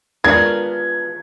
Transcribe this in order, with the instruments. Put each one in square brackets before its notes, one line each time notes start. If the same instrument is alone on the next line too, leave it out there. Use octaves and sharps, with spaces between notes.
[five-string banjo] G#3 B3 D4 F4 A#4 [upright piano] G#6